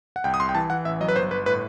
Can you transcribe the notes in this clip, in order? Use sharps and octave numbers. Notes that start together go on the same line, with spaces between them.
F#5
C2 G5
D#6
C2 C6
G5
E3 A5
E3 F#5
A1 E5
F#3 D#5
B4
G1 C5
G1 B4
A2 B4